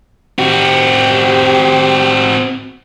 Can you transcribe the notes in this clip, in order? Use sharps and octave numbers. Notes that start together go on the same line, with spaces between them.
C4 F#4 G4